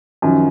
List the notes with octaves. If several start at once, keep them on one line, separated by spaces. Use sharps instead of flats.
F#2 D#3 F3